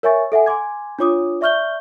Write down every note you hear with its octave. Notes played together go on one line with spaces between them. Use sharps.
A#4 C#5 E5 G#5 C#6 A6
A4 E5 F#5 G#5
G#5 C6 D6 G#6
D4 F4 C#5 D6 D#6
D5 E5 C#6 F6 G6 G7